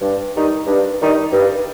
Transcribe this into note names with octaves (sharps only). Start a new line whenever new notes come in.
G2
D#3 G3 D#4
G2
D#3 G3 D#4
G2